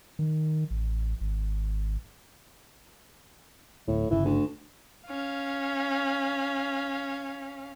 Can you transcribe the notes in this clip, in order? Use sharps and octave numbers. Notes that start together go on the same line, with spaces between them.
D#3
A1
G#1
D1 A2
G1 C#3 E3
D2
C#4 F5